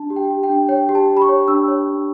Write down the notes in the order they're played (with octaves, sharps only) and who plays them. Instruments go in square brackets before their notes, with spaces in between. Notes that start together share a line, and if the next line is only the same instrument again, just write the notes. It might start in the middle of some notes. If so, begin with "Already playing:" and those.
Already playing: [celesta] D4 A5
G4
G5
G4
G5
D4
C#5 G5
G4
A5
G4
B5
C#6
C#5
D4 E6
C#5
D4